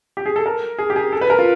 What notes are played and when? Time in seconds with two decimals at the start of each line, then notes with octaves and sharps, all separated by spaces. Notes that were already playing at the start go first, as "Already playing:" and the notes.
0.17 G4
0.26 G#4
0.36 A4
0.46 A#4
0.78 G#4
0.90 G4
0.96 G#4
1.12 A4
1.21 B4
1.30 A#4
1.39 F4